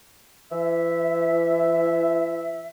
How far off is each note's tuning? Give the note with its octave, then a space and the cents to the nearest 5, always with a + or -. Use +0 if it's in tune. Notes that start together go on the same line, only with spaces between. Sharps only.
E3 +40 E5 -5